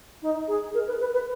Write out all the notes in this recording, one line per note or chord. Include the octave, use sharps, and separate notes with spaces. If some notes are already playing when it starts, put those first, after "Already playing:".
D#4
G#4
A#4
B4
B4
B4